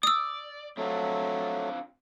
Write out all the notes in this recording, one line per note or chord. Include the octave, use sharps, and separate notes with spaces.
D5 D#6 E6
F#3 A3 C4 D4 F4